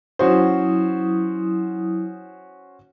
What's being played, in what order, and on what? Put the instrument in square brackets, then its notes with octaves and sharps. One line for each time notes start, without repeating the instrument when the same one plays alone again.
[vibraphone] F#3 E4 D#6 [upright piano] C#4 F#4 C5